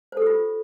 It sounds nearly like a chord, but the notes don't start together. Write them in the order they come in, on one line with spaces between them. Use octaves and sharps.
C5 A4 G4 F4